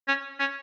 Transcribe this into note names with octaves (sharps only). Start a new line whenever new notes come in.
C#4
C#4